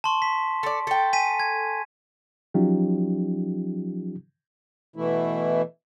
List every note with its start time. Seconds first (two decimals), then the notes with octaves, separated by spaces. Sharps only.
0.04 A5 C6 C#6
0.22 B6
0.63 A4 D5
0.87 A4 G5
1.13 G#5 B6 D#7
1.40 G#6
2.54 F3 F#3 C#4 D#4 F4 G4
4.96 B2 E3 A3 E4